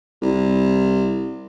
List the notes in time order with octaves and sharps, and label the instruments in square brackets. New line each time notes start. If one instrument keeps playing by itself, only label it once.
[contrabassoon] C2